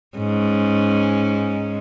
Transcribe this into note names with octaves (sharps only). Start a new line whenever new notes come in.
G#2 C#4